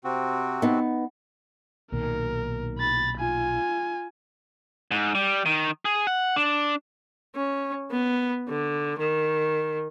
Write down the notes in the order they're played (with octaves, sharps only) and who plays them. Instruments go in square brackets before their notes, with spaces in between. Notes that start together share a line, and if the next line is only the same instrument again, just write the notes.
[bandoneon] C3 C4 F#4
[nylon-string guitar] B3 D#4
[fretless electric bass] B1 A#2 D#3 [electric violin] A#4
[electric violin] B5 A6
F4 G#5
[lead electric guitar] G#2
G3
D#3
G#4
F#5
D4
[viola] C#4
B3
D3
D#3